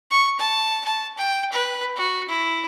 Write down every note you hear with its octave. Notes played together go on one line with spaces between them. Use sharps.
C#6
A5
A5
G5
B4
F#4
E4